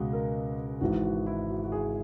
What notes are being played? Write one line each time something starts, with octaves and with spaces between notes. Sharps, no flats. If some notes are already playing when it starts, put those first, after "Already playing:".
Already playing: C#2 B2 G#3 F#4
A#4
G#1 G#2 E3 F#4
F#4
E4
F#4
F#4
G#4